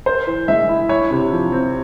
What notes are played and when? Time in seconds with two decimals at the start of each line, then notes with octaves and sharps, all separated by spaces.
0.06 A#4 C5
0.27 E3
0.48 G#3 E5
0.69 E4
0.89 E4 C#5
1.10 C3
1.31 F3
1.52 C4